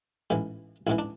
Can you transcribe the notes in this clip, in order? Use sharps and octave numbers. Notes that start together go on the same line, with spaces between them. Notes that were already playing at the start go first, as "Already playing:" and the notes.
A1 G#2 E3
A1 G#2 E3 E4
D4